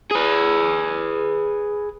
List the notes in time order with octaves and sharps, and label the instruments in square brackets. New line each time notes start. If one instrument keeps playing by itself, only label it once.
[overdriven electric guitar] G#4 B4